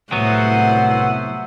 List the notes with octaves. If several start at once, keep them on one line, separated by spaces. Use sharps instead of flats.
C2 A2 F#3 B3 C5 E5 F#5